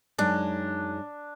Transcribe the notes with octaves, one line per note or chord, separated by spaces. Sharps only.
F#2 G#3 D4 D#4